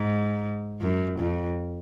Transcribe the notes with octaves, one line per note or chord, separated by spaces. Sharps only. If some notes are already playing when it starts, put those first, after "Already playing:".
Already playing: G#2
F#2
F2